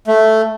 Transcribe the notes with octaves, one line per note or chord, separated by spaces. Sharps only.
A3